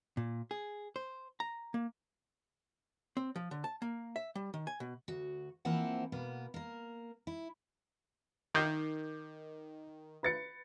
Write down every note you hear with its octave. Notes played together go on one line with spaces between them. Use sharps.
A#2
G#4
C5
A#5
A#3
C4
F3
D3
A5
A#3
E5
G3
D#3
G#5
B2
D2 F#4
E3 F3 A#3 C4 E4 F#5
B2 A#3 B3
A#3 A#4
E4
D#3 D6 G6 C7
B4 A6 C#7